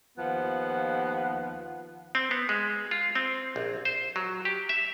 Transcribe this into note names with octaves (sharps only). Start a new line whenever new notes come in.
D#2 F3 B3 F#5
C4
B3
G#3
F4
C4
A#1
C5
F#3
G4
E5